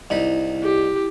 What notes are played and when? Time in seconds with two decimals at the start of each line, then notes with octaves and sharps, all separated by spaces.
0.10 C2 D#4 E4 B5
0.63 G4